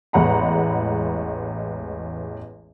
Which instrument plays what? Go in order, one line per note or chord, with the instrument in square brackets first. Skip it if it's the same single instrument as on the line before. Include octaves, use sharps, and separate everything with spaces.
[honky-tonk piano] A1 E2 G#3 F#5 A#5 B5